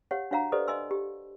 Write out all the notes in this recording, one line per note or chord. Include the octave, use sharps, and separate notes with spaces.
G4 C#5 F5 F#5
D4 F#4 C#5 F5 F#5 A#5
G4 A4 B4 C5 D5 D#5
D#5 F5 G#5 C6 E6
G4